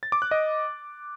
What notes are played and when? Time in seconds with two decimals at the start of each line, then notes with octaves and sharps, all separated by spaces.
0.03 A6
0.12 D6
0.22 F#6
0.31 D#5